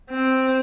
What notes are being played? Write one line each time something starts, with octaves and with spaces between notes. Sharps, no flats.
C4